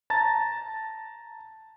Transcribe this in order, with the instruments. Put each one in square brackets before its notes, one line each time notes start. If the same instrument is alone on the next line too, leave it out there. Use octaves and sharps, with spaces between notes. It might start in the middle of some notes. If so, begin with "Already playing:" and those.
[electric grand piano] A5 A#5 A6